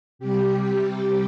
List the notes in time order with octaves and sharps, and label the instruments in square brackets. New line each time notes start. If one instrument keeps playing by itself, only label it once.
[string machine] C3 G3 G4